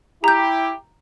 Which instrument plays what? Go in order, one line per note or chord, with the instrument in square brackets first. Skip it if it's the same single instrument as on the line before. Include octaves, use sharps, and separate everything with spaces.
[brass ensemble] E4 G4 [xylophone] A#5 G6